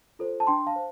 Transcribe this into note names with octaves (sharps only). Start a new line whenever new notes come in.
F4 A4 C5
A5
D4 G5 C6
F5 A5
C5